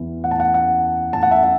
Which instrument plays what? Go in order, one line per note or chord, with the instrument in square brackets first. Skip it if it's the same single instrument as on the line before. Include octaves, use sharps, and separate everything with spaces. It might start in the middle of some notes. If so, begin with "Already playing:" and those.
Already playing: [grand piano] E2 E3
F#5
A5
F#5
F#5
A5
F#5
E5 A5
E5